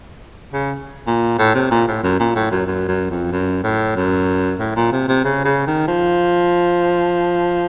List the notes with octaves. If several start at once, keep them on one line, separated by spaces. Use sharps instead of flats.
C#3
A#2
A2
C3
A#2
A2
F#2
A#2
A2
F#2
F#2
F#2
F2
F#2
A2
F#2
A2
A#2
C3
C3
C#3
C#3
D#3
F3